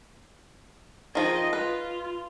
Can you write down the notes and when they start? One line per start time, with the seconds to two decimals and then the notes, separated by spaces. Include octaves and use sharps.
1.15 D#3 F3 G#4 D#5
1.53 F4 B4